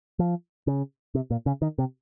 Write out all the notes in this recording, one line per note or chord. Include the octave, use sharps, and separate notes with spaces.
F3
C#3
C3
A#2
C#3
D#3
C3